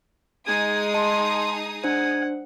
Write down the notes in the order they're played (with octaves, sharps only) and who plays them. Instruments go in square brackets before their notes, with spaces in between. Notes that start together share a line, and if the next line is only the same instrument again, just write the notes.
[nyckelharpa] G#3 [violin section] D#4 G#4 D#6 [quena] G#6
[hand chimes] D#5 A5 [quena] C6
[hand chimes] D4 C5 [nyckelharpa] F#5 [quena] G#6